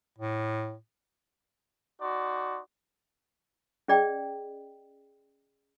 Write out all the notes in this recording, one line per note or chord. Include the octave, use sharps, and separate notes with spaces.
A2
D#4 F#4 D5 C6
C#4 G#4 D5 D#5 G5